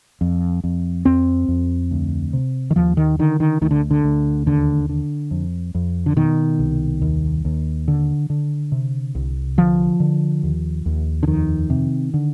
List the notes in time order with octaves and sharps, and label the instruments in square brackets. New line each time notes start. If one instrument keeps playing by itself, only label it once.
[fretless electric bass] F2
F2
F2 C4
F2
D2
C3
D#3
D#2 F3
D#3
D3 D#3
D#3
D2 D#3
D3
D3
D2
D#2 D3
D3
F2
F2
D3
B2 D#3
C2
D#2
D#2
D3
D3
C3
C2
D3 F3
D3
D#2
D#2
D3
F2 D#3
C3
D3